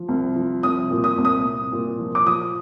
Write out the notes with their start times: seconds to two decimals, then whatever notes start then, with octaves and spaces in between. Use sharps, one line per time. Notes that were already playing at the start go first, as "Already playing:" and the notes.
Already playing: F3
0.08 C2
0.36 F3
0.63 C2 D#6
0.91 A#2
1.04 D#6
1.18 C2
1.25 D#6
1.45 C2
1.72 A#2
1.99 F3
2.15 D6
2.26 F3 D#6